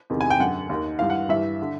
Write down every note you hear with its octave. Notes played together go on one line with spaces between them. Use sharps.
E2 C3 D#3
G#5
G5
F#2 D3 F#5
D#2 D#3
G2 E3 F5
F#5
G2 E3 E5
D3